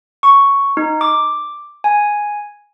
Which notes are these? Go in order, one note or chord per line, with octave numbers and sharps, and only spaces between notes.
C#6
D#4
D6
G#5